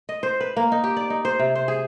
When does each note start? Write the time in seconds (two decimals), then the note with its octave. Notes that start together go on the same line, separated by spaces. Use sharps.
0.09 D#5
0.23 C5
0.41 B4
0.57 A#3
0.72 D#4
0.84 G4
0.97 D5
1.10 D#4
1.25 C5
1.39 C3
1.55 C5
1.68 G#4